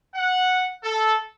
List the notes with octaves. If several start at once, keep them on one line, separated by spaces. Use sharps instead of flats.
F#5
A4